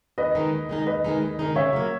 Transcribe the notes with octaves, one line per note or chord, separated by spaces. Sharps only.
D#2 B4 D#5
D#3 G#3 D#4
D#2
D#3 G#3 D#4
D#2 B4 D#5
D#3 G#3 D#4
D#2
D#3 G#3 D#4
C#3 C#5 E5
F#3 A#3